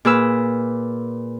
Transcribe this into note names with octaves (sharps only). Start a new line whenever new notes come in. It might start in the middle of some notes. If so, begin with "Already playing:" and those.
A#2 G#4 B4 B5 E6